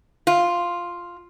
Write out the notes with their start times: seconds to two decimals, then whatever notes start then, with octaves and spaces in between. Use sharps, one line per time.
0.27 F4